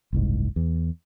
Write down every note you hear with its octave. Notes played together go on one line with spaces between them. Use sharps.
F#1 C2 G#2
E2